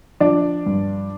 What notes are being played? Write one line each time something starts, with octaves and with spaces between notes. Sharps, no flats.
F3 D4 D5
G2